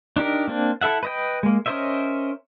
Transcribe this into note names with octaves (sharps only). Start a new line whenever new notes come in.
D4 D#4 G4 A#4
A#3 C4 D4
E4 A4 E5 F#5
B4 D#5 G5
G#3 A#3
C#4 A#4 C5 D#5 E5